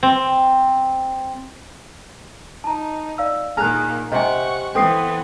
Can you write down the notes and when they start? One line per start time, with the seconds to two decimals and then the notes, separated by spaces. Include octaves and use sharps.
0.03 C4
2.64 D#4 A5 A#5
3.18 D5 F5 E6
3.57 A#2 D#3 A#3 G#4 A#5 F6 F#6
4.12 C3 D#5 F#5 G#5 C#6
4.75 E3 B3 C4 A4 D#6 C7